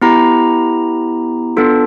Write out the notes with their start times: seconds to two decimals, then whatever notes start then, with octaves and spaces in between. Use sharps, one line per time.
0.01 B3 E4 G4 A#5
1.57 B3 D4 F4 A4